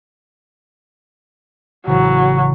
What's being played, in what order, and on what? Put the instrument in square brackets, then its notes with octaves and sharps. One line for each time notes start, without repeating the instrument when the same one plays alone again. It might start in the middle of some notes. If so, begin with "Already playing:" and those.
[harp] A1 C#3 [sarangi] F#3